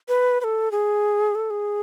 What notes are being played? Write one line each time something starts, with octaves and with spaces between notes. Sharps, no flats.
B4
B4
A4
G#4
A4
G#4